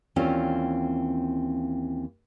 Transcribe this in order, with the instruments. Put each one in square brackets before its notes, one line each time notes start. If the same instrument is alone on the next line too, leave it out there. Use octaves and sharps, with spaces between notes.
[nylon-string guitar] D#2 E3 C4 C#4 F4 D5